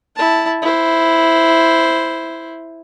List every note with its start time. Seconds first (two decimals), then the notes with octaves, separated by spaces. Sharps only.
0.16 E4 A5
0.62 E4 C5